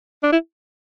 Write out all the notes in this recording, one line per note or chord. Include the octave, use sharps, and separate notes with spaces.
D4
E4